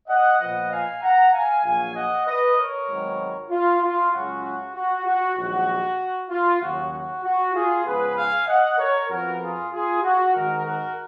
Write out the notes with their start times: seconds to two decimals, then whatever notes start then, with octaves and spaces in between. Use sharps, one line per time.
0.08 D#5 F#5
0.40 A#2 F3 B3 D#5 F#5
0.71 F5 G#5
1.02 F#5 A#5
1.32 F5 G#5
1.64 A#1 A#2 F#3 A#3 F5 G#5
1.95 D#5 F#5
2.26 B4 D#5
2.57 A#4 C#5
2.88 G#1 G#2 D#3 F#3 B3
3.50 F4
3.81 F4
4.12 C#2 C#3 F#3 C#4 F4 F#4
4.43 F#4
4.74 F#4
5.06 F#4
5.37 A#1 G#2 D#3 F#3 F#4
6.30 F4
6.61 D#2 C#3 F#3 C#4 F#4
6.93 F#4
7.23 F#4
7.54 F4 G#4
7.85 C#2 C#3 F3 B3 G#4 B4
8.16 F5 G#5
8.47 D#5 F#5
8.78 A#4 C#5
9.09 F2 F3 B3 F4 F#4 A#4
9.40 F4 G#4
9.71 F4 G#4
10.02 F#4
10.34 G#2 D#3 G#3 D#4 F#4 A#4
10.64 F#4 A#4